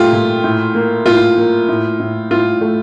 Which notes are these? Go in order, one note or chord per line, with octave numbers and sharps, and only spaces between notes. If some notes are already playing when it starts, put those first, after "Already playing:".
Already playing: A#2 A3 F4 G4
A#2
A2
A#3
A2 F4
A#3
A2
A2
A2 F4
A3